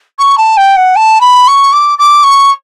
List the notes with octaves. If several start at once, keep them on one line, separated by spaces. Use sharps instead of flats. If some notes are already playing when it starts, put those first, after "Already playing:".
C#6
A5
G5
F#5
A5
B5
C#6
D6
D6
C#6